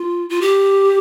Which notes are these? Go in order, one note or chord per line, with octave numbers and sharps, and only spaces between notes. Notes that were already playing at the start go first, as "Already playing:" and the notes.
Already playing: F4
F4
G4